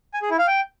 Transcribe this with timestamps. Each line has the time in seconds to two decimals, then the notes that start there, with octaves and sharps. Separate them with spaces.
0.14 G#5
0.22 G#4
0.31 E4
0.39 F5
0.47 G5